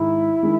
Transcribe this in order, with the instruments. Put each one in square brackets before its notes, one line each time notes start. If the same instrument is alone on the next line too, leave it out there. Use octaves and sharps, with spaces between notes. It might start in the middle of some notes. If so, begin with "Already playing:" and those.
Already playing: [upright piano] G#2 D#3 G#3 [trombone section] E4
[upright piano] D#3 G#3